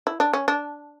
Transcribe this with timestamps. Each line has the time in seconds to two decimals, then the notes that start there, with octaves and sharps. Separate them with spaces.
0.07 E4
0.20 D4
0.33 C#4
0.48 D4